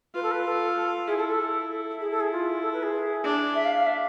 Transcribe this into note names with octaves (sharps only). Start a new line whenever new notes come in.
F4 B4
A4
B4
A4
E4 G#4
A4
A4
E4 G#4
A4
G#4
F4
A4
B4
G#4
D4
E5
F5
F5
E5